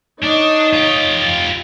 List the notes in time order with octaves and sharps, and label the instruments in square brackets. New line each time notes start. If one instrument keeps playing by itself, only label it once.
[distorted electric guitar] D4 [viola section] D#4 C#5 D#5
[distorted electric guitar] F4 G4